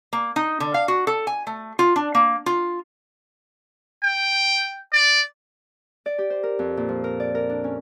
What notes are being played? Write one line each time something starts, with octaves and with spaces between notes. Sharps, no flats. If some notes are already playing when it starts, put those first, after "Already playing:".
A#3
D#4
D3
F5
F#4
A4
G#5
A3
F4
D4
A#3
F4
G5
D5
D5
G4
C5
A#4
F2
A#2
F3
A#4
D5
A#4
D4
C#4